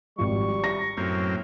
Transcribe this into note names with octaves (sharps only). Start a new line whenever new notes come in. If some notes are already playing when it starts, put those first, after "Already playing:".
G#1 F3 G3 C#6
A#6
F#2 A2 A#3 C4